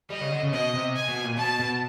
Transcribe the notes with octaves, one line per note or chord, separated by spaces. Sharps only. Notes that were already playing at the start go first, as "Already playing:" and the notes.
G3 D#5
C#3
D3
C#3
B2 D#5
C3
G#5
B2
A#2
B2 A5
B2